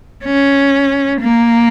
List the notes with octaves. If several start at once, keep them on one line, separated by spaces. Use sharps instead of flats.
C#4
A#3